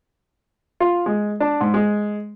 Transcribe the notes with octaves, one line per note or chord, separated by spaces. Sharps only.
F4
G#3
D4
G#2
G#3